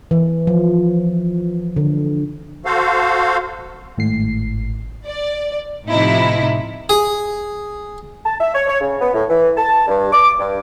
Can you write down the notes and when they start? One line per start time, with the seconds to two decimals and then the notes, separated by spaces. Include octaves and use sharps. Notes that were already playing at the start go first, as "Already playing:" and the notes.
0.11 E3
0.47 F3
1.76 D3
2.65 F#4 A4 C5 F5
3.98 G#1 A2 C7
5.05 D5
5.89 A2 C3 F3 D#4 E4
6.89 G#4
8.25 A5
8.40 E5
8.55 C#5
8.67 C#5
8.80 C#3
9.01 B3
9.14 A2
9.29 E3
9.57 A5
9.87 G2
10.13 D6
10.39 G2